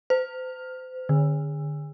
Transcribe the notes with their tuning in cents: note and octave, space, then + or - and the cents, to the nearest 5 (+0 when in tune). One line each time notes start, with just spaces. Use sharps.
C5 -35
D3 +25